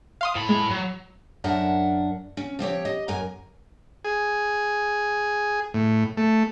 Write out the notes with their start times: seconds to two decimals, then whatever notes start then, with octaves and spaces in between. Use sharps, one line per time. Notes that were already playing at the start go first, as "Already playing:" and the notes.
0.21 F5 C6 D#6
0.35 A2 B5
0.49 G#3
0.70 F#3
1.44 F#2 D4 A#4 E5 F#5 A5
2.37 C#4
2.59 F3 C4 G4 C#5
2.85 D#5
3.08 F#2 A#4 G#5
4.04 G#4
5.74 A2
6.17 A3